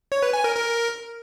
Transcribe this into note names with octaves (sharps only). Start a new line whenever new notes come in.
C#5
B4
G#5
A#4
A#4